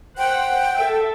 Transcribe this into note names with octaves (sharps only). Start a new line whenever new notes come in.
C5 F#5 G5
A4 E5